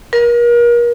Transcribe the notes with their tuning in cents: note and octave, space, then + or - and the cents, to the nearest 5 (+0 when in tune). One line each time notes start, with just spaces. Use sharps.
A#4 +35